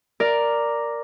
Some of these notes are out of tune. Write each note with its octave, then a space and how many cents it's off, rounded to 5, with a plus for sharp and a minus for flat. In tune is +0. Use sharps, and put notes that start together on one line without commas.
A#4 +0 D5 +0